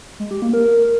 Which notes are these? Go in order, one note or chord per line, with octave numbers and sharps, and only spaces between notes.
G#3
G4
A#3
A#4